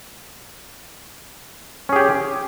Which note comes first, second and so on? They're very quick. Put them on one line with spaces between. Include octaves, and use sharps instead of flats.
C#4 G#4 G4